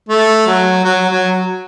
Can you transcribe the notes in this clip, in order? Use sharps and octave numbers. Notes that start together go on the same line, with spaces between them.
A3
F#3
F#3
F#3